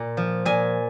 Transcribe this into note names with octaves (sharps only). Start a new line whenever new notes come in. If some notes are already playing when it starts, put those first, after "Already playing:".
Already playing: A#2
F3
A#2 G#5